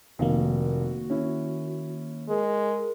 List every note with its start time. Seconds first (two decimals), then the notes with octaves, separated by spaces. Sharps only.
0.19 F1 D#3 A#3 F#4 F5
1.10 C#4 E4
2.29 G#3 A#4